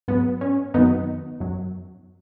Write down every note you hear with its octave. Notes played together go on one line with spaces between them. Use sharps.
G#2 F#3 B3
C#4
F#2 D#3 F#3 B3 D#4
F#2 F#3